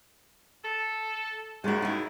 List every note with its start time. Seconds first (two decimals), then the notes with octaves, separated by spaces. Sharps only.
0.63 A4
1.64 D#2 A2 C#3 G#3 F#4
1.82 D#4 E4